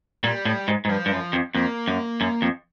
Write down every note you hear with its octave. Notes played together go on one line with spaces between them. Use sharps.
A#2 G3
A2
G#2
G#2
G2 F3
G2
F#2
F2
F2 A#3
F#2
F#2
F2